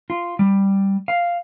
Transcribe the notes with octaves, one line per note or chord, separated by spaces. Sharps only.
F4
G3
F5